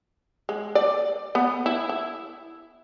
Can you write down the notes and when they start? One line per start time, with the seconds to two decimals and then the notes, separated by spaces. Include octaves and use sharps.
0.49 G#3
0.75 D5
1.35 B3
1.66 E4
1.89 E4